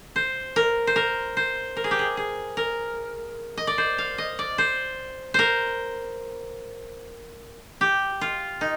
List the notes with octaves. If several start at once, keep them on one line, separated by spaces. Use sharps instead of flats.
C5
A#4
C5
A#4
C5
A#4
G#4
G4
G#4
G#4
A#4
D#5
D5
C5
F5
D#5
D5
C5
A#4 C5
G4
F4
D#4